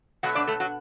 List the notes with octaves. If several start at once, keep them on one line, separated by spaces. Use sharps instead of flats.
B2 F#3 A3 F#4 F#5
D4 D5
A3 A4
F#3 F#4